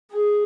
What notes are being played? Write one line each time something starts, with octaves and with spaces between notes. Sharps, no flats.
G#4